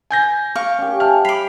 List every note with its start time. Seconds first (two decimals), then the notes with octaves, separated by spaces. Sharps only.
0.10 G#5 G6 A#6
0.55 F5 C#6 D6
0.78 C#4 G4
1.00 E5 G#5 A5 F6
1.25 B5 D6 B6 C7 F7